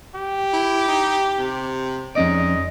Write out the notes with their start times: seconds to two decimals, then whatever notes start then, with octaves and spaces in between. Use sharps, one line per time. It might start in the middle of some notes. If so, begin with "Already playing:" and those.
0.15 G4
0.53 E4
0.88 D#4
1.38 C3
2.15 F2 G#2 C#4 D5 D#5